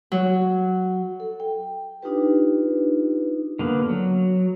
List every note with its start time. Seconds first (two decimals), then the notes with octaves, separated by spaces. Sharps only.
0.12 F#3
1.20 A4
1.40 G5
2.03 D4 D#4 F4 G4 B4
3.59 D3 A#3 B3
3.89 F#3